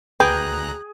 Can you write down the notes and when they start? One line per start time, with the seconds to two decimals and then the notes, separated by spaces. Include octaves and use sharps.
0.20 D2 G#4 B4 G5 A#5 F#6